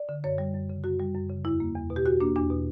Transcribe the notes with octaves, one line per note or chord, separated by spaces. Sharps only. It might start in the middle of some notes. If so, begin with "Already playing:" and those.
Already playing: D5
D3
F#2 C#5
G3
F#2
C#3
F#2 F#4
G3
F#2
C#3
E2 E4
A#3
E2
B2
G4
E2 F#4
A#3 D4
E2 D4
B2